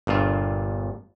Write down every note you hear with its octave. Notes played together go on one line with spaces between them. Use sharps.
G1 G2 A#2 F4